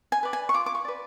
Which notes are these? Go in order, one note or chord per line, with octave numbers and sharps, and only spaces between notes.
G#5
B4 D5
G#5
C#6
F4 D6
D6
C#6
B4 D5